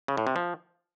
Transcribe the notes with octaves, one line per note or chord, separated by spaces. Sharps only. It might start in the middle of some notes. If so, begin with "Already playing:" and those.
C#3
A2
C3
F3